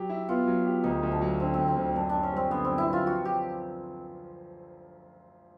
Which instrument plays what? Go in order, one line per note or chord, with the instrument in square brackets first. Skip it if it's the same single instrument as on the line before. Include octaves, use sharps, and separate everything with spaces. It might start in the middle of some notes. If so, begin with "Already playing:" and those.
Already playing: [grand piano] F#3 G4
E4
[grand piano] B3 [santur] F4
[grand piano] F#3
G4
[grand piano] D2 [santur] D#4
[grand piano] D2
[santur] D4
[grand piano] F#3
[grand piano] D3 [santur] C4
[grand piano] D2 [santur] C4
[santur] C4
[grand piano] D2
[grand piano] F#2 [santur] D4
[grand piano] F#2 [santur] D4
[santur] C#4
[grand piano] G3 [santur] C4
[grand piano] D3 [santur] B3
[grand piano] F#2 [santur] C4
[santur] E4
[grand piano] F#2 [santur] F4
[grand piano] F3 [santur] F#4
[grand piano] F3 [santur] G4